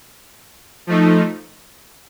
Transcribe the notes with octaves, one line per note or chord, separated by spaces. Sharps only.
F3 A3 D#4